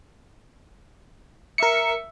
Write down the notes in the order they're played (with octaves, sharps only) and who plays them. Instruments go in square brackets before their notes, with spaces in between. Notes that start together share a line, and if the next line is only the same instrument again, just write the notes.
[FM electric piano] A#4 C#7 [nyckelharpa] E5